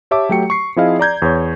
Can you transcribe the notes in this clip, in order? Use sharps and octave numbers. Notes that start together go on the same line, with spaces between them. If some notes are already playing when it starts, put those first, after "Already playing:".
G4 C#5 E5 A5 D6
F#3 A3 G4 G5 C#7
C#6 C7
F3 C4 E4 G#4 D#5 F5
D5 A#5 G6 G#6
E2 C#5